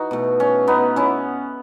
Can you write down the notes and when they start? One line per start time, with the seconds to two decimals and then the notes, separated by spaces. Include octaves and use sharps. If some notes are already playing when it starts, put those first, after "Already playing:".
Already playing: E3 D#4 F#4
0.11 B2 A3
0.40 C#4
0.68 B3 D#4
0.96 C#4 E4